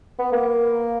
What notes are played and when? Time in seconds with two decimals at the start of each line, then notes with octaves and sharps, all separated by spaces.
0.19 B3
0.32 A#3